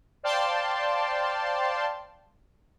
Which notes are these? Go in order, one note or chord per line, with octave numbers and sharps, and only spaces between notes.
C5 D5 F5 G5 A5 C6